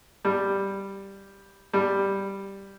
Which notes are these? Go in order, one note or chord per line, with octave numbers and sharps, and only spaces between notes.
G3
G3